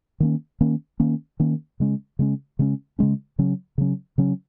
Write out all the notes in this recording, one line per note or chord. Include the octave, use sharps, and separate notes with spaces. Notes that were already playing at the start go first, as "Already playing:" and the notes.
D#3 A#3 C#4
D#3 A#3 C#4
D#3 A#3 C#4
D#3 A#3 C#4
C#3 G#3 C#4
C#3 G#3 C#4
C#3 G#3 C#4
C#3 G#3 C#4
C#3 F#3 C#4
C#3 F#3 C#4
C#3 F#3 C#4